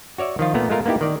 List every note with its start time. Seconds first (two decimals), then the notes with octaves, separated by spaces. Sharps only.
0.18 F#4 C#5 D5 E5
0.39 D#3 F3 F4
0.54 A#2 A3 B3 A#5
0.70 G#3 A3 F4 A#4
0.86 A#3 B3 D#4 E4 G4
1.01 D#3 D5